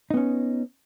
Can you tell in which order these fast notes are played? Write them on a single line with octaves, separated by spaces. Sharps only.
D#4 B3 C#4